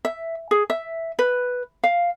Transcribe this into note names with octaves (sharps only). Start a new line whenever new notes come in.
E5
G#4
E5
B4
F5